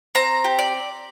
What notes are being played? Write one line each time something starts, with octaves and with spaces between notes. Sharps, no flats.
C4 A#5
G4
D5